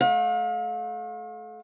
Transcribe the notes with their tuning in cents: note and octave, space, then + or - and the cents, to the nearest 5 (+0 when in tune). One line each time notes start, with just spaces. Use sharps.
A3 -30 F5 +40